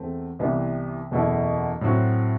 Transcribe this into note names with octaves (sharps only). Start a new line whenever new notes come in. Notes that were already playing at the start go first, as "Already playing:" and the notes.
Already playing: E2 A3 C4
C2 C3 E3 B3
F#1 E2 B2 A3 E4
A2 F#3 C4 F#4